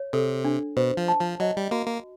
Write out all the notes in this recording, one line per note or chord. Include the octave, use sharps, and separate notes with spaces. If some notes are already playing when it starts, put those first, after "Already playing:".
Already playing: C#5
C3 A4
D4
B2 C5
F3
A5
F3
F#3 D#5
G3
A#3 F#4
A#3